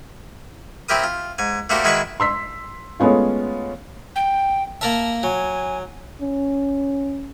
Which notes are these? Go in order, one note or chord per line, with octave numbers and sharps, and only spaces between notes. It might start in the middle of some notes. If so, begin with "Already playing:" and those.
C4 E4 G4 A#4 D#6
F4
G#2 G#5
A3 A#3 D4 F#4 G4 C5
D#3 G#3 E4 F#4 B4 C#6
C6 E6 B6
G#3 A3 B3 C#4 F4
G5
A#3 A#4 E5 A5
F#3 G#5
C#4